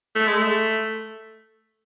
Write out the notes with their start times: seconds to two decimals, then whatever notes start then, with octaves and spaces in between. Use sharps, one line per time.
0.15 A3
0.27 G#3
0.38 A3